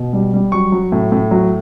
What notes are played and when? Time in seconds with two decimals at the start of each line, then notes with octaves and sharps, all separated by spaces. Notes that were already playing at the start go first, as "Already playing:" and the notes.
Already playing: B2
0.13 G3
0.34 G3
0.52 F#3 C#6
0.72 F#3
0.92 A2
1.12 A2
1.31 F#3